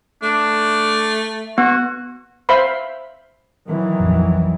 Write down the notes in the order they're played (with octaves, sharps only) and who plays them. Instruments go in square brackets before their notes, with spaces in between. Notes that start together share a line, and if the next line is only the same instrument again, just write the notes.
[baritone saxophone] A3 [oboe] D4
[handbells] B3 [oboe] F#4
[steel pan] C5 E5 F5 B5 C6
[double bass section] D#3 E3 F#3
[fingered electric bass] A#1 F2